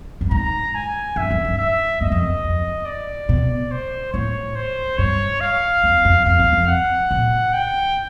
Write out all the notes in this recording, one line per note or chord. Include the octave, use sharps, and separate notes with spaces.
G2
G#2 A#5
G#5
G2 E5
F#2
G2
E5
G2 D#5
F2
F#2
F2
D5
B2
C5
A2 C#5
C5
G2 C#5
F5
F2
F2
F2 F5
E2
F2
F#5
A#2
G5